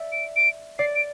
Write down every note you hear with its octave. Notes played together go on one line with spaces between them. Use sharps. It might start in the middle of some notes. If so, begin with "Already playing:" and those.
Already playing: D5 E5
D7
D7
D5 C7
D7